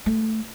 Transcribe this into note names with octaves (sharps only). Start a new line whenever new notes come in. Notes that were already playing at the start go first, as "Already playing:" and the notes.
A3